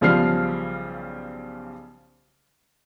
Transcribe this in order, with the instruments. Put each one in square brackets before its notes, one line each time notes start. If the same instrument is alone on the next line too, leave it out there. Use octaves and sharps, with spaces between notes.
[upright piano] B1 C#3 F3 G3 F6 C7